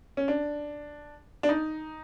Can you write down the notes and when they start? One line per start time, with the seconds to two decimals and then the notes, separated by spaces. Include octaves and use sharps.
0.17 C#4
0.28 D4
1.43 D4
1.49 D#4